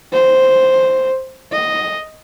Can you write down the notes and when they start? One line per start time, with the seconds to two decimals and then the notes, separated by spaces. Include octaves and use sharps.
0.13 C5
1.52 D#5